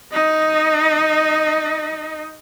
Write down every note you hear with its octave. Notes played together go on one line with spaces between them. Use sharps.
D#4 D#5